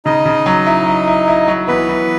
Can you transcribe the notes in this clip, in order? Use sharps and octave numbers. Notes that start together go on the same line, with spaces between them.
C#3 D#4 D#5
C#3
F#3
E4
E4
E4
E4
F#3
E3 B3 B4
E3